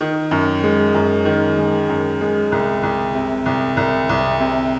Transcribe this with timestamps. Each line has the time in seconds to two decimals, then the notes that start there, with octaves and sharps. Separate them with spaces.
0.01 D#3
0.31 F#2
0.63 G#3
0.95 F#2
1.25 D#3
1.57 G#3
1.89 F#2
2.21 G#3
2.52 C2
2.83 C2
3.15 C3
3.46 C2
3.77 C2
4.09 C2
4.40 C3